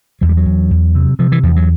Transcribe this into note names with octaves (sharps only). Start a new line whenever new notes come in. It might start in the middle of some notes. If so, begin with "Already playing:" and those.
E2 F#3
G3
F#3
E2
E2
C3
C3 F3
E3
E2 F3
F#3